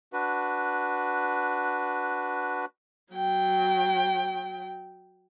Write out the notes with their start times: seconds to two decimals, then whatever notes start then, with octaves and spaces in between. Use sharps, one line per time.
0.13 D4 F#4 B4
3.13 F#3 G5